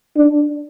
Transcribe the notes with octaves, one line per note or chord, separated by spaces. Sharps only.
D4